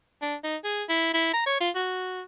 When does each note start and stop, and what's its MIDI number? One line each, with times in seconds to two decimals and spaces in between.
0.22 0.36 62
0.44 0.57 63
0.64 0.84 68
0.89 1.13 64
1.14 1.33 64
1.34 1.42 82
1.46 1.57 73
1.60 1.70 65
1.75 2.22 66